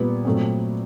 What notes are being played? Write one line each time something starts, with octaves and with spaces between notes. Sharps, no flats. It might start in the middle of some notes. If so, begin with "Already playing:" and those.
Already playing: A#2 G3 B3
A#2 F#3 A3 C4